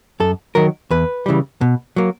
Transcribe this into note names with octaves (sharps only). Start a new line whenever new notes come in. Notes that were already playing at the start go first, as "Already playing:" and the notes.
F#2 A4
D#3 F#3 A#4
E2 B4
C#3 E3 G3
B2
F#3 A#3